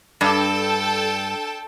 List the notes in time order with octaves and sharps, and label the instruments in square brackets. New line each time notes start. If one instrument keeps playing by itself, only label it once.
[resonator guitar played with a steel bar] G2 [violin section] A4 G5 A5